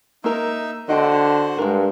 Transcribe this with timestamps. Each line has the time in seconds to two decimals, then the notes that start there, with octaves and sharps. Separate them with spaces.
0.24 A#3 D#4 A#4 E5
0.89 D3 F#4 C5 D#5 F#5 G5
1.58 G2 G#3 A#4